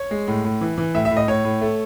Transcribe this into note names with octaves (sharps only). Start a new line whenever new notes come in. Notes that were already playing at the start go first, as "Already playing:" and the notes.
Already playing: C#5
G#3
A2
A2
E3
E3
A2 E5
E5
A2
D#5
A2 C#5
A2
A3